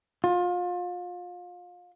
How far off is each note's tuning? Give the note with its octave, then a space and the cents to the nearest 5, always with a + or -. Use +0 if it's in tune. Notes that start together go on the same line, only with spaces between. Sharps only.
F4 +30